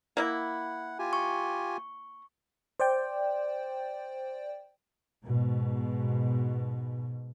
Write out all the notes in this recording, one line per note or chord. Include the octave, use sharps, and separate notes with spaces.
A#3 E4 F#5
F4 G4 G#5
C#6
C5 D5 G5
G#2 B2